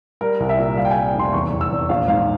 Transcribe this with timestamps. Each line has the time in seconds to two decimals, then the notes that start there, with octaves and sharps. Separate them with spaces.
0.21 G3 A#4
0.40 C2
0.49 E5
0.58 A#2
0.77 G3 F5
0.85 G5
0.91 G#5
0.96 G3
1.15 F1 C6
1.33 E2 C#6
1.52 E2
1.61 E6
1.71 E2
1.89 A#1 F5
2.08 G#2 F5